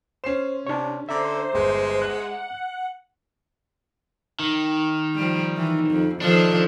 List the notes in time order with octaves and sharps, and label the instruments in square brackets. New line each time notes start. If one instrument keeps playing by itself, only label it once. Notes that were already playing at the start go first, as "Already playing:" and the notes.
[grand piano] C#4 C7 E7 [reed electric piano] C5
[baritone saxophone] C3 [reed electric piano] D4 C#5
[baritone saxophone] D3 [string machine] C5 [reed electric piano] E5 A#5 D6
[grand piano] G1 [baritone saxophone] G#3
[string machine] F#5 [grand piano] F#6
[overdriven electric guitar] D#3
[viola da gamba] F3 G3
E3
F2
[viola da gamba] D#3 F3 A4 [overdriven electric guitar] D4